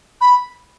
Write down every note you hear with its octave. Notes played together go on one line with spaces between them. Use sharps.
B5